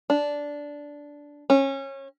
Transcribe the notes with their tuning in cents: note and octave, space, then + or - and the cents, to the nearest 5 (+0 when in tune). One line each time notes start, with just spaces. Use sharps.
D4 -10
C#4 -25